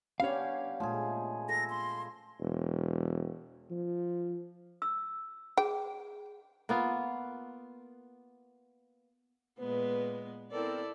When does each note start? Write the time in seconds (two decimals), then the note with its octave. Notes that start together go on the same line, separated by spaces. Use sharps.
0.20 B3 C#4 D4 G4 C#5 F5
0.80 A#2 F3 G#3 A3 G#4
1.49 A4 A#6
1.70 C6
2.40 E1
3.71 F3
4.82 E6
5.58 G#4 G5
6.69 A#3 B3 F4
9.59 A#2 G#3 B3 B4
10.51 B3 C4 E4 A4 A#4 D5